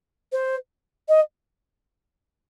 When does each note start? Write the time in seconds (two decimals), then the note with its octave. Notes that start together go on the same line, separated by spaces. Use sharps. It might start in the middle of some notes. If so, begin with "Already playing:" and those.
0.32 C5
1.09 D#5